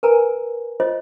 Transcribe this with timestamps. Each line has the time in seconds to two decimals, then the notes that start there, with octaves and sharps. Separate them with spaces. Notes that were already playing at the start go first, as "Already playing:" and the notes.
0.03 A#4 B4 G#5 A#5
0.80 F4 C5 C#5 D#5